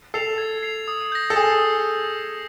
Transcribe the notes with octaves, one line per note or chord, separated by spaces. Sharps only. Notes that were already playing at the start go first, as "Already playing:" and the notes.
A4 C7 F7
G#6
C7 F7
D#6
G6 A#6
A4
G#4 D#6